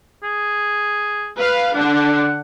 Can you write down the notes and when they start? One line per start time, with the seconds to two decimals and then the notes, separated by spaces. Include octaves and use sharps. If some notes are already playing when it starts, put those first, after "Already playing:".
0.23 G#4
1.39 B4 F5
1.75 D3 D4 F#5